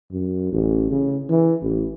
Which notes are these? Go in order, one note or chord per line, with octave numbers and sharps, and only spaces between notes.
F#2
A1
C#3
E3
A1